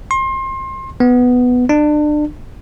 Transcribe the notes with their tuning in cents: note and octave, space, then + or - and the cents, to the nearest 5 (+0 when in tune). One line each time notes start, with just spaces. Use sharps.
C6 +30
B3 +5
D4 +30